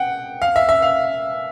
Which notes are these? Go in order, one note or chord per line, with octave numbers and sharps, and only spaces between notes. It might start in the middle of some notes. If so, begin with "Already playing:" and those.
Already playing: F#5 G5
F5
E5
E5
F5